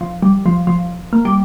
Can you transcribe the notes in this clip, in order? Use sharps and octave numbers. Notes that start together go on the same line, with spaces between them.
F3
G3
F3
F3
A#3
G3